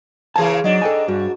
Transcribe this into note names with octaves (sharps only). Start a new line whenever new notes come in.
C#3 E3 A#3 G#4 A5
G#2 F#3 D4 D#5
A4 G5 G#5
G2 F#4